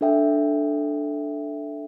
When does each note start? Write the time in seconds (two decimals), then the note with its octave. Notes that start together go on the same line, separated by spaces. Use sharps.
0.01 D4 A4 E5 G5